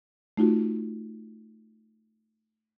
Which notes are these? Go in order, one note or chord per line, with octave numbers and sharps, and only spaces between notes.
A3 D#4 F4 F#4